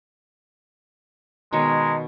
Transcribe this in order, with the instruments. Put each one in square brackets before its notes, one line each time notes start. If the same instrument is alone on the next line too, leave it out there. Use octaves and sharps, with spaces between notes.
[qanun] B2 D#3 C#5 [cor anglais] G#3 [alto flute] A#5